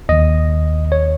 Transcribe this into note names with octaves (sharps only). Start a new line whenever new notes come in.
D#2 D#3 D#5
C#5